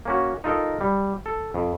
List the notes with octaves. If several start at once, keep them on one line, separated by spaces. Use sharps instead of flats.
A#3 C#4 F#4
D#4 F4 A4 A#4 D#5
G3
A4
F2